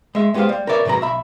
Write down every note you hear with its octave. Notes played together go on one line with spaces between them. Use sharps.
G#3 E5
G#3 B3 G4 B4 C5 F5
G3
A#4 B4 C#5 D5 E5
G#2 C3 F#3 B4 A#5
B1 E5 B5